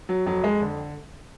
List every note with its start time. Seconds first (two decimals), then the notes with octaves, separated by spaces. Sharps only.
0.09 F#3
0.26 F2 F#3
0.44 G#3
0.62 D3